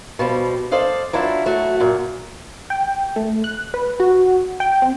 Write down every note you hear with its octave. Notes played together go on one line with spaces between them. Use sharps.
B2 F3 G3
A4 C5 D5 D#5 F5
F#3 D4 E4 F4
F#3 A3 F#4
F#2 A#2
G5
A3
F#6
B4
F#4
G5
C4